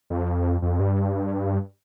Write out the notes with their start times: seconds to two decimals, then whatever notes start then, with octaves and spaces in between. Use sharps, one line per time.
0.10 F2
0.62 F2
0.80 G2